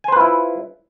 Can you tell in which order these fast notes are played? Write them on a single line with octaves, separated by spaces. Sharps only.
G#5 C5 B4 F4 E4